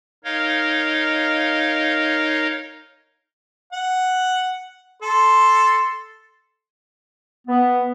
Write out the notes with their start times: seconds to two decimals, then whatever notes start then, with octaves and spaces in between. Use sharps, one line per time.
0.24 D#4 A#4 C#5 D#5 F5
3.73 F#5
5.02 A4 C6
7.47 B3